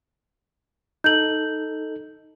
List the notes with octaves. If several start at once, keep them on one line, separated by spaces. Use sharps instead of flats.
D#4 A4 G6 F#7